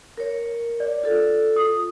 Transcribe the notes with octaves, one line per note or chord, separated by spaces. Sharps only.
A#4 C#5
D5
F4 A4
D#6